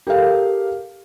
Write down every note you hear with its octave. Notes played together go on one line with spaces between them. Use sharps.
G4 A4 A#4 F5